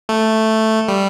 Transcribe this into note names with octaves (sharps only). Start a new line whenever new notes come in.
A3
G3